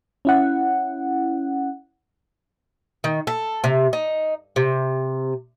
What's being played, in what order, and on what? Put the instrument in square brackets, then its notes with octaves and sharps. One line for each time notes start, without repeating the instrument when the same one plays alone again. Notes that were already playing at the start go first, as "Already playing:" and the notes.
[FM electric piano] C#4 E4 F#5
[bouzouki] D#3
A4
C3
D#4
C3